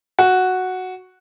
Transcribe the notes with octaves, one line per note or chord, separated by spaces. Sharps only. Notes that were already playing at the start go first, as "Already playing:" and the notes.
F#4